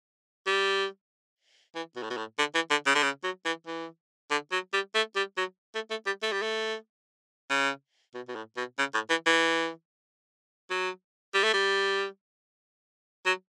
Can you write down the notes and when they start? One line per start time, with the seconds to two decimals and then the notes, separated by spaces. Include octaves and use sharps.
0.47 G3
1.75 E3
1.96 B2
2.03 A2
2.10 B2
2.17 A2
2.39 D3
2.55 E3
2.71 D3
2.87 C#3
2.95 D3
3.03 C#3
3.24 F#3
3.46 E3
3.67 E3
4.31 D3
4.52 F#3
4.73 G3
4.95 A3
5.16 G3
5.37 F#3
5.75 A3
5.91 A3
6.06 G3
6.23 A3
6.33 G3
6.42 A3
7.50 C#3
8.15 B2
8.28 B2
8.35 A2
8.57 B2
8.79 C#3
8.94 A2
9.10 E3
9.26 E3
10.70 F#3
11.34 G3
11.44 A3
11.53 G3
13.26 F#3